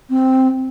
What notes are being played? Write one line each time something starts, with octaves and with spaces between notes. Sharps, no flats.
C4